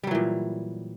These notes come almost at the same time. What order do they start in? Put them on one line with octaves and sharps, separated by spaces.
G3 F#3 E3 A#2